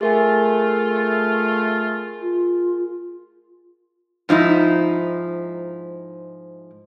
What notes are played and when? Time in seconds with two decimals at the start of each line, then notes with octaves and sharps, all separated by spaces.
0.01 A3 F4 G#4 A#4 G#5
2.21 F4
4.29 G#2 F3 D#4 E4